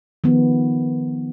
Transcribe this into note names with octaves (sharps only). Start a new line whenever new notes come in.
D#3 F3 B3